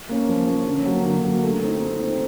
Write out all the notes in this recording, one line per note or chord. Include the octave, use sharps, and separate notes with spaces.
A#3 C#4
F3
A#3 C#4
D3
F#3 A#3
D3
F#3 A#3
A3
C4 D#4
A3
C4 D#4